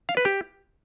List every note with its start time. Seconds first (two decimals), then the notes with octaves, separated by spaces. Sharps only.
0.09 F5
0.17 B4
0.25 G4